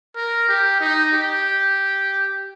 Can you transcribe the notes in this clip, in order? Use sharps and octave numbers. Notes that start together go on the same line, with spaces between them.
A#4
G4
D#4
G4